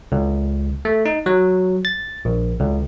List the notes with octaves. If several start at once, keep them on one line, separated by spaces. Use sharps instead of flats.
C#2
A3
D#4
F#3
A6
A#1
C#2